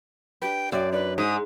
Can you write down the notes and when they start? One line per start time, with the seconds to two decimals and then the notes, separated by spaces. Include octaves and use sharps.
0.42 D4 G4 B4 G5
0.72 F#2 D5 E5 G5
0.92 D4 D#4 B4 D5
1.18 G#2 D#6